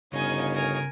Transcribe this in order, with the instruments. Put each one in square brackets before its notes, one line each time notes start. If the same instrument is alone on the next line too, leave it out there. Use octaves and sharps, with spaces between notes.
[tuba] G1 [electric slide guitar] C#3 [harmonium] D#4 C#5 F5 [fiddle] D#5 G#5
[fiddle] A#4 G#5